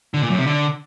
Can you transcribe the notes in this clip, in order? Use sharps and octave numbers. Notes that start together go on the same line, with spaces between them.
D3
A#2
F#2
C3
D3